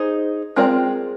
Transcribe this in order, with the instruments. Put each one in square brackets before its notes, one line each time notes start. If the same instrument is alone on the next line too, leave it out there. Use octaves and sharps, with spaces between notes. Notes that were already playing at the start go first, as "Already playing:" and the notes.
Already playing: [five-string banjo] D#4 G#4 C5
G#3 C4 F4 A#4 D5